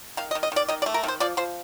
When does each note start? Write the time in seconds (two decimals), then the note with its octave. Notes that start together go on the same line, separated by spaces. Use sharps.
0.17 D#3 F5
0.31 D#5
0.35 D#3
0.43 D#5
0.52 D#3 D5
0.69 D#3 D#5
0.82 D5
0.86 A3
0.94 A#4
1.03 D#3 C5
1.20 F3 D5
1.37 F3 C5